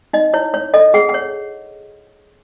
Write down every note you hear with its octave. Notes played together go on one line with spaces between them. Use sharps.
D#4 D#5
E4 C#5
C#5
A4 D#5
G#4 F#5
F#5
C#5